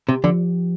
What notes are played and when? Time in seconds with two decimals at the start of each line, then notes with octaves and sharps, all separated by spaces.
0.09 C3 G4
0.24 D3 F3